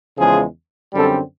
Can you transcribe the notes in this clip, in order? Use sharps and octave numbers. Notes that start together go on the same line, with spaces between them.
E2 C#3 F3 G#3 G#4
F#2 D3 G3 C4 A4